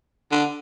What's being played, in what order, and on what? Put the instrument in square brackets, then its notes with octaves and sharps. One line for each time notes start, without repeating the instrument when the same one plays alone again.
[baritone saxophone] D3